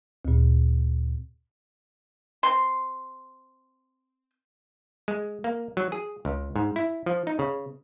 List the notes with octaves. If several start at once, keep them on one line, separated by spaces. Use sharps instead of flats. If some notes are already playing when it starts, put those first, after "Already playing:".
D2 A#2
C4 C6
G#3
A#3
F#3
G#4
C#2
G#2
E4
F3
D#4
C#3